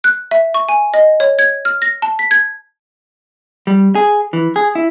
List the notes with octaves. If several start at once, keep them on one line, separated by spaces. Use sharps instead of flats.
F#6
E5
C#6
G#5
D#5
C#5
G#6
F6
A#6
A5
B6
G#6
G3
G#4
E3
G#4
E4